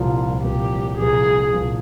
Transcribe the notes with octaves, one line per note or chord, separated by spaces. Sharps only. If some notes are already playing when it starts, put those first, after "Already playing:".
Already playing: C2 A#2 F3 F4
C2 A#2 F3 G4
C2 A#2 F3 G#4
C2 A#2 F3